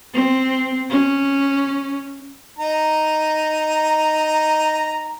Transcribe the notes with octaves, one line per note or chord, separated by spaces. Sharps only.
C4
C#4
D#4 A#5